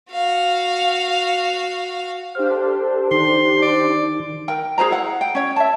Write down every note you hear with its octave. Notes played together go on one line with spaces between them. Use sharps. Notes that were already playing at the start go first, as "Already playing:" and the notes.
F#4 F5
D4 G4 C5 F5
A4
D#3 C6
D5
A#4 G5
G#4 B4 C5 A#5
E4 F#5
G5
C#4 C#5
E5 A5